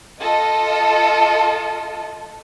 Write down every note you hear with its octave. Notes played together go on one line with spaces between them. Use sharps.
F4 A4 D#5